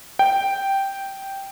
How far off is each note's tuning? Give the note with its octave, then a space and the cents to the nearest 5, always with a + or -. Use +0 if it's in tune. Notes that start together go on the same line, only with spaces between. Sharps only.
G5 -5